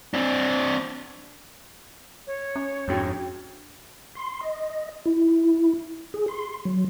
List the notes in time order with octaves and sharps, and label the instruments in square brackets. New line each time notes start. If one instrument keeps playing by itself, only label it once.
[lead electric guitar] C4 D4
[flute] C#5
[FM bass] C#4
[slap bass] F2 G#2 [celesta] D4 F#4 G5
[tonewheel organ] C6
D#5
E4
G#4
C6
F#3